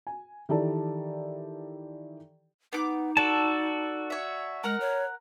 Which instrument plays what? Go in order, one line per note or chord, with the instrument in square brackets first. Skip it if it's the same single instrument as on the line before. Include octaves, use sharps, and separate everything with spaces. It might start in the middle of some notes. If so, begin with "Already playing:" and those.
[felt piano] G#5
D#3 E3 G4 A4 D5 A5
[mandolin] B3 D6 [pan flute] D#4
[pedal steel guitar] F#4 D5 A5 [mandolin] A4
[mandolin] C#5 E5
[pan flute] G#3 [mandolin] A#4 F#5 F6
[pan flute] C#5